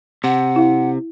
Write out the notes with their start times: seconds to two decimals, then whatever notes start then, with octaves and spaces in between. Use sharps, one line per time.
0.24 C3 F#5
0.56 E4 F5